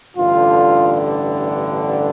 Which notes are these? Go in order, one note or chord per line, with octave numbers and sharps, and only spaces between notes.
A1 G2 D3 F4